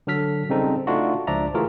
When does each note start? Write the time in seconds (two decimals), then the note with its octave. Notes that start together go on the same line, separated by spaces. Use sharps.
0.07 D3 F#3 A4 F6 B6
0.49 C#3 G3 C4 D#4 A4
0.87 A3 D4 D#4 F4 F#4
1.27 C#2 F3 D4 D5 E5 A#5
1.54 E3 A3 F4 F#4 G#4 A#4